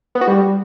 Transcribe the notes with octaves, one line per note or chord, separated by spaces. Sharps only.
B3
F#4
G3